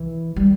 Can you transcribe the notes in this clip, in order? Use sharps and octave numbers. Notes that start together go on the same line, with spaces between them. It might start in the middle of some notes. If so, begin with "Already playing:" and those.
Already playing: E3
G3